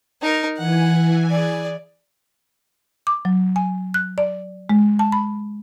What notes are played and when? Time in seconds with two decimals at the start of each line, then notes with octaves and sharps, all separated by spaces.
0.22 D#4 A#4
0.57 E3 F#5 G#5
1.30 G#4 D5
3.07 D6
3.25 F#3
3.56 G#5
3.94 F#6
4.18 D5
4.69 G#3
4.99 A5
5.12 B5